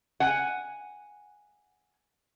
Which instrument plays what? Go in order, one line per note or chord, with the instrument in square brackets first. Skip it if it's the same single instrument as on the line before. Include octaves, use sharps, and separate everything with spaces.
[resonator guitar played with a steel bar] F#5 G#5